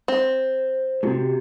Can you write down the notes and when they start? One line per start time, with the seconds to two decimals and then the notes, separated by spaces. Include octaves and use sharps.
0.08 C4
1.03 A2 C3 F#4 G4